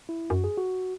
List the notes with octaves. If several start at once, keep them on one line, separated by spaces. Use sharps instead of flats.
E4
F#2 F#4
G#4
F#4